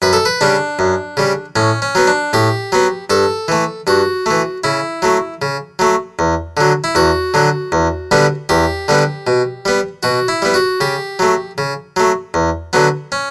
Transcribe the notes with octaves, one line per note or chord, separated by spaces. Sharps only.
F#2 B4
A4
B4
C#3 G3 D4
F#2
C#3 G3
A2 C#4
C#4
F#3 B3
D4
A2 G4
F#3 B3
G2 A4
E3 A3
G2 F#4
E3 A3
C#3 E4
F#3 A3
C#3
F#3 A3
E2
D3 F#3
E4
E2 F#4
D3 F#3
E2
D3 G3 B3
E2 G4
D3 G3 B3
B2
G3 B3
B2 F#4
E4
G3 B3
F#4
C#3 G4
F#3 A3
C#3
F#3 A3
E2
D3 F#3 B3
C#4